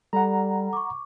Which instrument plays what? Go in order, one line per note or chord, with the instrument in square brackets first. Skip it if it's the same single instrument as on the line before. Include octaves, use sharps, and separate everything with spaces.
[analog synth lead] G3 [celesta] A4 [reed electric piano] F#5 A#5
[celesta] C#6 D6